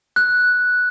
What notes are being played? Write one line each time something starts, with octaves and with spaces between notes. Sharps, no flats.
F#6